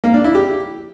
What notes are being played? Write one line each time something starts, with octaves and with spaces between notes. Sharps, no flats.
A#3
D4
E4
G4